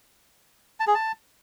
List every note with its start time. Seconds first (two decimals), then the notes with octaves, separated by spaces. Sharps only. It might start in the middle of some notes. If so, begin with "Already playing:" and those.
0.80 A5
0.87 G#4
0.95 A5